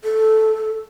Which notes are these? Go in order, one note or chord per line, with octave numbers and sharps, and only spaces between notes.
A4